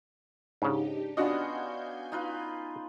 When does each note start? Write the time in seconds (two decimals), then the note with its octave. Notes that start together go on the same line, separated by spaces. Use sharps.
0.62 G#2 C#3 D4 D#4 G4
1.17 B3 C#4 D4 F4 F#4 D#5 G#5 G6
2.12 D#4 F4 B4